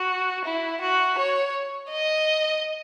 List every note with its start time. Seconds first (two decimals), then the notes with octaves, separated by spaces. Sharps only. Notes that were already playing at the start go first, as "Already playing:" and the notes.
Already playing: F#4
0.45 E4
0.82 F#4
1.18 C#5
1.91 D#5